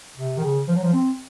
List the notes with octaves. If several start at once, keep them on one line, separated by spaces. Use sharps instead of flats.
C3
D#3
C#3
F3
F#3
F3
C4